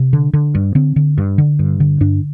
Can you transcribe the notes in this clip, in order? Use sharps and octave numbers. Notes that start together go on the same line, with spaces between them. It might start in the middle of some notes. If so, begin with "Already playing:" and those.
Already playing: C3
D3
D3
G2
D3 C4
D3
G2
D3
G2
D3
G2 D4